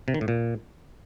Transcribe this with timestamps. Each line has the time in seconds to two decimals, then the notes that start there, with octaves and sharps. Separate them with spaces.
0.08 C3
0.14 D#3
0.21 A2
0.28 A#2